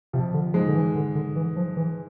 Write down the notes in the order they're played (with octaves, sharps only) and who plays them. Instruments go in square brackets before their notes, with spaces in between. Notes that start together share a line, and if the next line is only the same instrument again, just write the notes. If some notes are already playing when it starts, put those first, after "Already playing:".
[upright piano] F2 F3 [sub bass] C3
[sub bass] D3
[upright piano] G#2 G#3 [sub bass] F3
[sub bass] D3
E3
D3
D3
E3
F3
E3